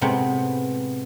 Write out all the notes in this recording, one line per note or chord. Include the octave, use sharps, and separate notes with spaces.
A2 C3 G#3 B3